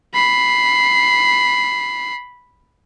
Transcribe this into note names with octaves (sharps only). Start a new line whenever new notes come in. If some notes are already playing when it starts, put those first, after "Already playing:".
B5 C7